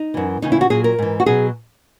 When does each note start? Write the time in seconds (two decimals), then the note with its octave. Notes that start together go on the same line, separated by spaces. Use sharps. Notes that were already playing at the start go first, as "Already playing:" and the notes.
Already playing: D#4
0.14 F#2 E3
0.42 D#2 C#3 E3 D#4
0.52 E4
0.61 F#4
0.70 A#2 F#3 G#4
0.84 A#4
0.99 G#2 E3
1.20 F#4
1.26 B2 F#3 G#4